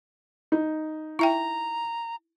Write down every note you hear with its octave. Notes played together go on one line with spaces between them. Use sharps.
D#4
E4 E5 G5 A#5